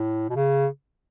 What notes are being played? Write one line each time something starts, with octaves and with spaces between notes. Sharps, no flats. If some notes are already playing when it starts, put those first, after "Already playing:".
Already playing: A2
B2
C#3